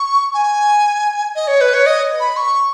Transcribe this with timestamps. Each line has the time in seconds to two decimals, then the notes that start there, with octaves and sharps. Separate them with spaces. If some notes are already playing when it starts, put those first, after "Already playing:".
Already playing: C#6
0.34 G#5
1.35 D#5
1.48 C#5
1.61 B4
1.74 C#5
1.86 D#5
2.20 B5
2.37 C#6